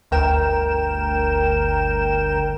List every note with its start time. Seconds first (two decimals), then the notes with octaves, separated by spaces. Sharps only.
0.11 G1 D2 A#4 G5 E7